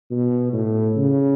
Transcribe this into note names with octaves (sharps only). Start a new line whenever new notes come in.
B2
A2
C#3